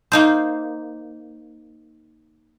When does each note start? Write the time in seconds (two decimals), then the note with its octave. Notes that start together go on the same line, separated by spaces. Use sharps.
0.12 A#3 D#4 C5